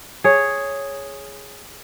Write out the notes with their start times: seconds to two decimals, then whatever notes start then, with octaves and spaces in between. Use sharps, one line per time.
0.24 G#4 C#5